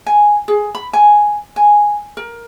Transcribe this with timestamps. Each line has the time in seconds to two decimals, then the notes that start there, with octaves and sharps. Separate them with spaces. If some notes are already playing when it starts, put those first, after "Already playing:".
0.06 G#5
0.48 G#4
0.75 B5
0.93 G#5
1.56 G#5
2.17 A#4